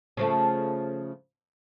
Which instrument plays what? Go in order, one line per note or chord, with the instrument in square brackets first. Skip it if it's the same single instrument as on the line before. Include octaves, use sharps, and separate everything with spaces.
[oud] C#3 F3 A3